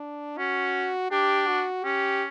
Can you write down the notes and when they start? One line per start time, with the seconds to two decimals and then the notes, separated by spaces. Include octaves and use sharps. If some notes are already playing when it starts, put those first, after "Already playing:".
Already playing: D4
0.38 C#4 F#4
1.12 D4 G4
1.48 F#4
1.84 C#4 G4